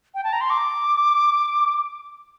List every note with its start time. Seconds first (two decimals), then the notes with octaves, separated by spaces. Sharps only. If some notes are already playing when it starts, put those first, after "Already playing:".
0.15 G5
0.24 A5
0.33 A#5
0.41 C6
0.50 D6